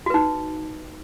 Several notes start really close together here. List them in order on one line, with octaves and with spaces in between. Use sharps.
F#4 B4 D#4